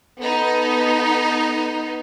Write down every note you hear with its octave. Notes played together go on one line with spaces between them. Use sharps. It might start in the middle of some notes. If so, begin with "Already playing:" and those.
B3 D#4 A4